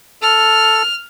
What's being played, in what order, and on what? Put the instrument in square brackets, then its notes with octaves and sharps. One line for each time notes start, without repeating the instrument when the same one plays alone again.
[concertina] A4 [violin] F6